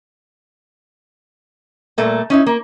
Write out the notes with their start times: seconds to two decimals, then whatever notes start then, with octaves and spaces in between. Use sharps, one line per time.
1.98 A#2 G3 A3 A#3
2.30 C#4 D#4 E4
2.47 A#3